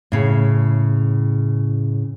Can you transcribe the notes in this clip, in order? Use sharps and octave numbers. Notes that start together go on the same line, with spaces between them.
A2 C#3